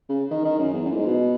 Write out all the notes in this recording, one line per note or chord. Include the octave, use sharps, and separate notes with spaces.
C#3
D#3
D#3
F#2
E2
F#2
A#2
G#2
B2